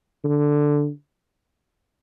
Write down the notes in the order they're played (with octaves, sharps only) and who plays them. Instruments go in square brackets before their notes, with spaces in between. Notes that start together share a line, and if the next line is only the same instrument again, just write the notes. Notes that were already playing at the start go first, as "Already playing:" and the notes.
[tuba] D3